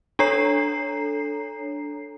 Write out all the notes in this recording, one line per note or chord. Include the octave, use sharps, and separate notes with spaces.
D4 A4 C#5 A#5 C7